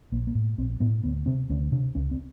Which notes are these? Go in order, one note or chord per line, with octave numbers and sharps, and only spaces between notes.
A#1 A#3
A#3
A2
A#1 C4
A2 B3
D2 B3
C3 C4
D2 C#4
C3 D4
C#2 C#4
C4